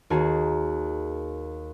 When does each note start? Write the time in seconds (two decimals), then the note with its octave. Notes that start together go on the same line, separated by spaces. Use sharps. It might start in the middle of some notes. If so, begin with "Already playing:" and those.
0.10 D#2 F#4 G#4 A5 A#5 C7